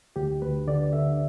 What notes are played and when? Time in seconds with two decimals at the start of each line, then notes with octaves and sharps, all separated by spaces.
0.16 D2 G4
0.42 D2 B4
0.67 D3 D5
0.93 D3 E5